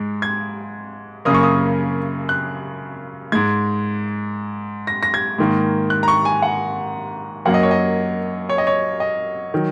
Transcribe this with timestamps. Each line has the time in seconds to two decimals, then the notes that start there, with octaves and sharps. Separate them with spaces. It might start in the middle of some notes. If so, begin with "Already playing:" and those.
Already playing: G#2 G#3
0.22 G#6
1.25 F#2 C#3 A#3 D#6
1.34 C#6
1.43 D#6
2.29 F#6
3.32 G#2 G#3 G#6
4.87 A#6
5.03 A#6
5.14 G#6
5.38 G#2 D#3 A#3
5.90 F#6
6.03 A#5
6.08 C#6
6.25 G#5
6.42 F#5
7.45 F#2 F#3 A#3 F#5
7.54 D#5
7.63 C#5
7.71 D#5
8.49 C#5
8.58 D#5
8.67 C#5
9.00 D#5
9.54 D#3 F#3